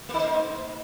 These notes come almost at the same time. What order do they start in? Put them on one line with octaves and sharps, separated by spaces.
A3 D#4 C5